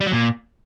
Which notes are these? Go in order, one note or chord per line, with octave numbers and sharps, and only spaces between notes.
G3
F#3
A#2